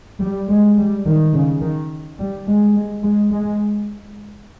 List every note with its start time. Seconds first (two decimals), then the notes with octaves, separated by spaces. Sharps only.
0.21 G3
0.49 G#3
0.77 G3
1.06 D#3
1.34 C#3
1.62 D#3
2.19 G3
2.47 G#3
2.76 G#3
3.03 G#3
3.31 G#3